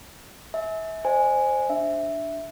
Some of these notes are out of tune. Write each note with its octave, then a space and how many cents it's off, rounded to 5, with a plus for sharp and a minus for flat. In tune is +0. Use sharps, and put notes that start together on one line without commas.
E5 -30 G#5 +25
C5 +5 D#5 -45 G#5 +0
D4 +0 E5 +0